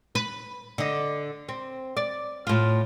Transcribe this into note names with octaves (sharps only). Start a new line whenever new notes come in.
B4
D3 D#5
C4
D5
A2 F4